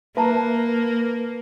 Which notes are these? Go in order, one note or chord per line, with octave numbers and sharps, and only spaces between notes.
A#3 B4 E5 A5 A#5